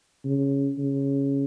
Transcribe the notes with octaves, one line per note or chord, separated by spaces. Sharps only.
C#3
C#3